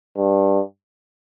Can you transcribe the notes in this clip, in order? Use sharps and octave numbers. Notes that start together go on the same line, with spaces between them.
G2